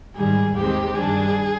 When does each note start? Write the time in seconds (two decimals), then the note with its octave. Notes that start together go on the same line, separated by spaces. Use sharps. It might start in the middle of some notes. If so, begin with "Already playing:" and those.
0.16 G#2 D#3 G3 G#4
0.56 D#2 D#3 G#3 C4 G4
0.95 G2 D#3 G3 D4 G#4